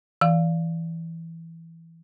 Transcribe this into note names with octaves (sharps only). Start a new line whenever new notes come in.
E3 F5